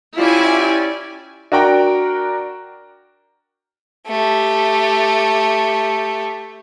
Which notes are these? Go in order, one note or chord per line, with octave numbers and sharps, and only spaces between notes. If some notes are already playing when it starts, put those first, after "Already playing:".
C#4 E4 F4 G4 D5 G#5
D4 F#4 A#4 G5 A#5
A3 G4